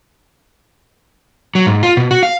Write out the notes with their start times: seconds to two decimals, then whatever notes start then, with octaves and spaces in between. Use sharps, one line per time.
1.55 F#3
1.67 G#2
1.83 F4
1.97 B2
2.11 F#4
2.23 F5